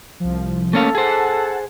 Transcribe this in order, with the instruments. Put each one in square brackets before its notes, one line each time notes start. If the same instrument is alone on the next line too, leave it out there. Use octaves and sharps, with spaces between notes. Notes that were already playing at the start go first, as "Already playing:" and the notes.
[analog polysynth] C2 F3
[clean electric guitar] A3 C#4 F5 [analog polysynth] A#3 [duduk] A4
[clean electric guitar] G#4 C5 [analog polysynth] F#5 A5